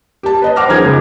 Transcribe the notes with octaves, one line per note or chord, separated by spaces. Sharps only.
G4 A5
B4 D#5 A5
C5 F#5 D6 F6 A#6
F#2 D#3 F3 G#4 F6 G#6
C#2